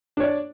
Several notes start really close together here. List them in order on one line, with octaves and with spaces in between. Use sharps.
D4 C#5 D5